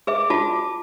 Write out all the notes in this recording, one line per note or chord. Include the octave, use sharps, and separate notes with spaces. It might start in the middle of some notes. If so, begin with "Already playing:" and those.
G#4 B4 E5 D6
F4 F#4 A5